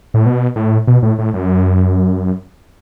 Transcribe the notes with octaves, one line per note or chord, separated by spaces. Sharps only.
A2
B2
A2
B2
A2
A2
F#2